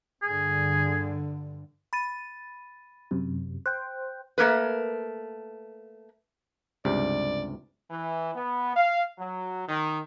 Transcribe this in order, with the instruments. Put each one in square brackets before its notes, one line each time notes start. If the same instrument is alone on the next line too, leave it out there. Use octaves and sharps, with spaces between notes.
[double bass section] G2 D3 [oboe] G#4
[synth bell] B5 A6 D#7
[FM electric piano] F#2 C3
[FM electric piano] C5 G5 [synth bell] F#6 G6
[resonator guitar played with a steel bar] A3 A#3 A#4 B4
[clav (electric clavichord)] C#2 G2 C3 [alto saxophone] D5
[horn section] E3
B3
F5
F#3
D#3